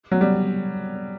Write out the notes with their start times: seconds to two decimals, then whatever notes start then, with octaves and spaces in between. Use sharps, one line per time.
0.12 F#3
0.21 G3